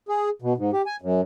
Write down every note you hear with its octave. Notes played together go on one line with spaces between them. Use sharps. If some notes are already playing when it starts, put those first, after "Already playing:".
G#4
B2
G#2
G4
G#5
F#2